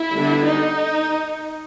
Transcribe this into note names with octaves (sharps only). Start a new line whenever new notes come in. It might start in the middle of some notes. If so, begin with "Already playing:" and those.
Already playing: E4
D3 G3 B3 D4
D#4